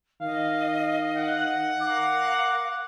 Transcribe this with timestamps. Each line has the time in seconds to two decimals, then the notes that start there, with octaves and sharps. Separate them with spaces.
0.21 D#3 D#5 F5
1.17 F#5
1.81 A#4 F5 D6